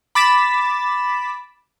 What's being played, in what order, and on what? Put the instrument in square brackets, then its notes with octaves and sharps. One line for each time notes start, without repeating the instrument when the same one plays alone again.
[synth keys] B5 D6 A6 B6 E7